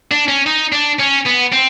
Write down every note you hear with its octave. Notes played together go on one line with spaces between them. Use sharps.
D4
C#4
D#4
D4
C#4
B3
C4